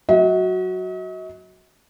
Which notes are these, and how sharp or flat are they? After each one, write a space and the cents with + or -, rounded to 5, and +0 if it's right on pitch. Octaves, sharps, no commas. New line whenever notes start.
F#3 +0 F#4 +0 D#5 +45